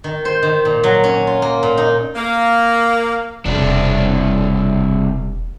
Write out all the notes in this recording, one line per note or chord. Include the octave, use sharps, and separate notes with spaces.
D#3
C5
D#3
A#2
F#3
C#4
F4
A#3
A#2
D#4
A#3
E1 C2 C3 D4